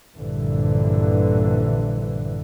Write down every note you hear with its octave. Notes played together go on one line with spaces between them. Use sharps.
A#1 G2 D3 E3